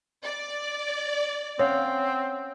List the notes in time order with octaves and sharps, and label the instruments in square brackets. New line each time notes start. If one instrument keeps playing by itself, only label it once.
[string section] D5
[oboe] C4 [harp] C#4 F5 F#5 [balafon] C#5